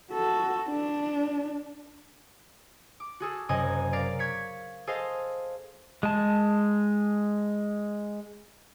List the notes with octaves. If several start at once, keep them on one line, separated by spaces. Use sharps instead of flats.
F#4 A4
D4
D6
F#4 G#4 A4
F#1 F#2 C3 D#5 G#5
A#4 D5 F5
C#6 G#6 B6 C#7
G#4 A4 C5 D#5 F5
G#3 A5